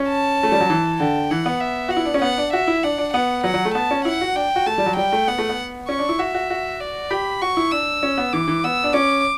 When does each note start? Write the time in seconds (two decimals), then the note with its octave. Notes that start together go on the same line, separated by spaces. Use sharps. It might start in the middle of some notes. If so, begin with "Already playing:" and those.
Already playing: C#4
0.08 A5
0.43 A3
0.52 G3
0.61 F#3
0.70 E3
1.00 D3 G5
1.31 E3 F#5
1.46 B3
1.61 E5
1.89 F#4 F#5
1.97 E4
2.05 D4
2.14 C#4
2.22 B3 F#5
2.38 D4
2.53 F#4 E5
2.68 E4
2.83 D4 F#5
2.98 D4
3.14 B3 F#5
3.44 F#3 F#5
3.54 F#3
3.65 A3
3.75 B3 A5
3.91 C#4
4.05 E4 F#5
4.21 F#4
4.36 D4 G5
4.56 F#4
4.66 A3 A5
4.78 G3
4.86 F#3
4.97 G3 G5
5.13 A3
5.28 B3 F#5
5.39 A3
5.49 B3
5.89 C#4 C#6
5.99 D4
6.09 E4
6.19 F#4 E5
6.34 F#4
6.50 F#4
6.80 D5
7.11 G4 B5
7.42 F#4 C#6
7.57 E4
7.72 D4 E6
8.03 C#4
8.18 B3
8.33 E3 D6
8.48 E3
8.64 B3 E6
8.84 D4
8.93 C#4 D6